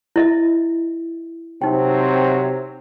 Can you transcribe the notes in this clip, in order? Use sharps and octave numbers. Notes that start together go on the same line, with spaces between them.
E4 D#5 E5
C3 F#3 C4 D#4 G5